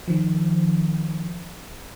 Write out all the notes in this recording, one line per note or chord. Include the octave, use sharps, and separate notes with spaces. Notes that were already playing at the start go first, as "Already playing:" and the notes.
D#3 F3